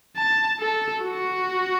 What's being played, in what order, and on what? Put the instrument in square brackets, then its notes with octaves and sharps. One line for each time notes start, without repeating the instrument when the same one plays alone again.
[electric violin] A5
A4
F#4